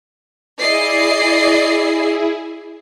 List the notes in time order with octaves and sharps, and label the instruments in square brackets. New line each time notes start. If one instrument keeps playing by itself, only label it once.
[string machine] E4 G#4 [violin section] D5 D#5 C7